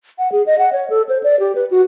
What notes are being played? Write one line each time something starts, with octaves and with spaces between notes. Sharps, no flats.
F#5
G#4
D#5
F#5
C#5
A4
C5
D5
G4
B4
F#4